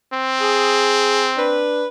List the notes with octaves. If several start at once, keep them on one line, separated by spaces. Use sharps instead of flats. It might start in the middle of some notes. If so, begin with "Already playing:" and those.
C4
G#4
D4 B4